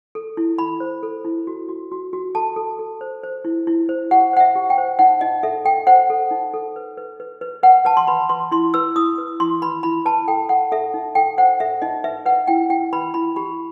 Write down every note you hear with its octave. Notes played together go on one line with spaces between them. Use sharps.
A4
E4
E4 B5
C5
A4
E4
F#4
F#4
F#4
F#4
A4 A5
A4
A4
C5
C5
E4
E4
C5
G4 F#5
C5 F#5
E5
G4
G5
C5
D#4 F#5
D#4 D#5
A4 E5
A4 G5
C5 F#5
A4
D#4
A4
B4
B4
B4
B4
B4 F#5
B4 A5
C6
B4 B5
B4 C6
E4 C6
B4 E6
E4 D#6
B4
E4 C6
B4 B5
E4 B5
B4 A5
A4 G5
A4 F#5
A4 E5
D#4
A4 G5
C5 F#5
A4 E5
D#4 D#5
B4 E5
B4 F#5
E4 G5
E4 G5
B4 B5
E4 B5
G4 B5